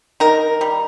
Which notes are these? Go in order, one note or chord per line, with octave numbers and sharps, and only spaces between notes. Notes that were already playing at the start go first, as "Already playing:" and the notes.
D#3 A#4
G3